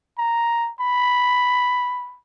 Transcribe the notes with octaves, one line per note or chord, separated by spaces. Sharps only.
A#5
B5